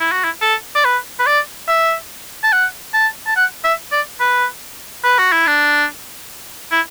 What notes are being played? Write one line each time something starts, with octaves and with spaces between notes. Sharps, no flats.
E4
F#4
E4
A4
D5
B4
B4
D5
E5
A5
F#5
A5
A5
F#5
E5
D5
B4
B4
F#4
E4
D4
E4